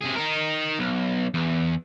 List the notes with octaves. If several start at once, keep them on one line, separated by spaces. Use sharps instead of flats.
C3 G#4
D#4 A#4
B1
E2